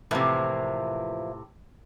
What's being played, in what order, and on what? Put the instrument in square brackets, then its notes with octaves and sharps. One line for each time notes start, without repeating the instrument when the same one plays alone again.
[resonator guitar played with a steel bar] A2 C3 [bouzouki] E3 F3 A#3